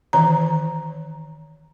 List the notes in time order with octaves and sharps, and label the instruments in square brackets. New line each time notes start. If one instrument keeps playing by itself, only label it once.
[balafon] D#3 E3 A#5